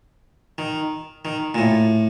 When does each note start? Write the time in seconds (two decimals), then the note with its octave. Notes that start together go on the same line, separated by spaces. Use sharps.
0.58 D#3
1.25 D#3
1.54 A#2
1.58 A2